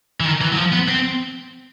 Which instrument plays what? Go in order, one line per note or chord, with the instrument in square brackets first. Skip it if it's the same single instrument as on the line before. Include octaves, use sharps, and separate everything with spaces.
[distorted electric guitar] E3
D#3
E3
F#3
F3
B3
C4